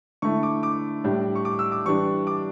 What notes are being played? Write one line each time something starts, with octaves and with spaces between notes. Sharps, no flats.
D3 A3 E4 C#6
D6
D6
A2 G3 D4
C#6
D6
E6
D6
E3 G3 D4 C#6
D6